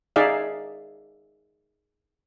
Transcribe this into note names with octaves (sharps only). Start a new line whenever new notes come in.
D#4 G#4 D5 E5 F5